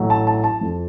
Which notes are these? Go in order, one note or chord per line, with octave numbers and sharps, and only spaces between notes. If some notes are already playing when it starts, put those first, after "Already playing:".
Already playing: A1 A2 F#3 A3
A5
A5
A5
F2 F3